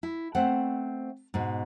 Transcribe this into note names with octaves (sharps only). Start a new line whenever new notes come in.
E4
A3 B3 C4 C5 F#5
G#2 B2